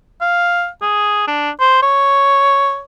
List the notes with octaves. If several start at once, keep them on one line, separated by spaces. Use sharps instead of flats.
F5
G#4
D4
C5
C#5